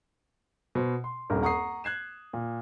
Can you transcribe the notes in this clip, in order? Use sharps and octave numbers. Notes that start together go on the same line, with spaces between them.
B2 C5
C6
D#1 G#1 G2 A#4
F#5 A#5 C#6 D#6 C7
F#6 G#6 C7 E7
A#2